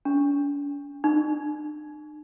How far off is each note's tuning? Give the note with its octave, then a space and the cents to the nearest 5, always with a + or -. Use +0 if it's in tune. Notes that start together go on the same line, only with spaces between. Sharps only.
D4 -45
D4 +45